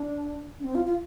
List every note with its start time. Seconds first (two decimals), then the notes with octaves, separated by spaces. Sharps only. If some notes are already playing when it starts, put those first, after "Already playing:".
Already playing: D4
0.60 D4
0.64 C4
0.75 F4
0.85 F4